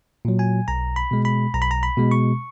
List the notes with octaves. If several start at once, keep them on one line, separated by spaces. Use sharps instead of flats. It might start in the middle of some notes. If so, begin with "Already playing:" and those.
A#2 F#3
G#5
B1 A#5
B5
B2 G#3
B5
B1 A#5
B5
A#5
B5
B2 G#3
C#6